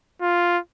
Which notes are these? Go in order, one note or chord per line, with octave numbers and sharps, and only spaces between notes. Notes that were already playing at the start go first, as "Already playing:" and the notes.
F4